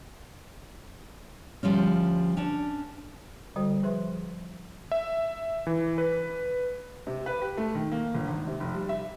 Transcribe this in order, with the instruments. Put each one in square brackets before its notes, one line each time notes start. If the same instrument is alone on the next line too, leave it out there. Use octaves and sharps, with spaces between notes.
[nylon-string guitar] D2 G#2 F3 G3 C#4
C#4 D4 A5
[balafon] D3 G3 F#4 C5 G5
F3 G#4 B4 C5 E5 C6
[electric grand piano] E5
E3
B4
[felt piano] C3
B4
G4
A3
D#3
A#3
G1
G#1
C3
F1
G3
E5